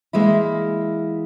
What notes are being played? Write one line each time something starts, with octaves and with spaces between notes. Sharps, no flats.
E3 G#3 A#3 E4